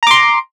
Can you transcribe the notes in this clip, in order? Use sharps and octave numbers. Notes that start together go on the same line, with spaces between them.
A#5 C6 D6